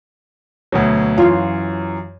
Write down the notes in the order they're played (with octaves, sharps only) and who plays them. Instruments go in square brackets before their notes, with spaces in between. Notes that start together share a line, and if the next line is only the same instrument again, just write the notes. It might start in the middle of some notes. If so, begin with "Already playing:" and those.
[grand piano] D2 B2 F#3
[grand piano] F#2 E3 [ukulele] F4 C#5 F5